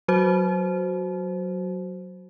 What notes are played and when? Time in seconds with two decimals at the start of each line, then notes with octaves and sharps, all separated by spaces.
0.08 F#3 F#4 C5